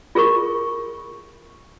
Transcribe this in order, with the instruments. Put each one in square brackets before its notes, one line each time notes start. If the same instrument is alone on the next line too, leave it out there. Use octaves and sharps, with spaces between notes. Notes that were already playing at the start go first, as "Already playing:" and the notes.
[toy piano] F4 G#4 A#4 C#6